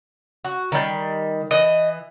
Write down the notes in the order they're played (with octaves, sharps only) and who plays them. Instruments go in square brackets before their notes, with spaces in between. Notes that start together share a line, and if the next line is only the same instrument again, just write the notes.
[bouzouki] F#4
D#3 G3
[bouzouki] E3 [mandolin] D#5